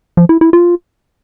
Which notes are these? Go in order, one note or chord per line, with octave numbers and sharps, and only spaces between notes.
F3
E4
E4
F4